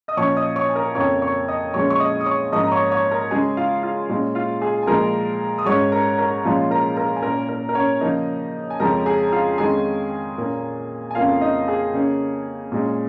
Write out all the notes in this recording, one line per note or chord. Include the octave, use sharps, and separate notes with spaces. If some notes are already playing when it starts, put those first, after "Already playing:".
D#5 D#6
A#2 F3 C#4 C#5 C#6
D#5 D#6
C#5 C#6
G#5
A#4 A#5
F2 C#3 A#3 C#5 C#6
C#5 C#6
D#5 D#6
A#2 F3 G#3 C#4 C#5 C#6
C#6
D#5 D#6
D#6
C#5 C#6
G#2 F3 A#3 C#4 D#5 D#6
A#5
C#5 C#6
C#5 C#6
A#4 A#5
C#3 G#3 C#4 G#4 G#5
F4 F5
F4 F5
A#2 G#3 C#4
F4 F5
G#4 G#5
G#5
A#2 F3 G#3 A#4 A#5
D#6
G#2 G#3 C#4 C#5 C#6
A#4 A#5
A#4 A#5
A#2 F3 G#3 C#4 F4 F5
A#4 A#5
A#4 A#5
G#5
A#2 A#3 C#4 A#4 A#5
A#4
A#4
C#4 C#5
C#3 F3 A#3 D#4 D#5
G#5
F2 C#3 F3 G#3 C#4 A#4 A#5
G#4 G#5
F4 F5
F2 D#3 G#3 C#4 G#4 G#5
A#2 A#3 C#4
G#5
F2 C#3 A#3 C#4 F4 F5
D#4 D#5
G#4
C#3 A#3 C#4
A#2 G#3 C#4